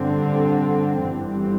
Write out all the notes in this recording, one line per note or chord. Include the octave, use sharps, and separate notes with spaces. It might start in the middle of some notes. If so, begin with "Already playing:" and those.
Already playing: G2 D3 C4
G1 G2 E3 G3 C4